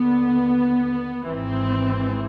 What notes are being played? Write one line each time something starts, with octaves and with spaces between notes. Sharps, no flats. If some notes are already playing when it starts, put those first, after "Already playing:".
Already playing: D#2 D3 B3
G#1 G#2 E3 C4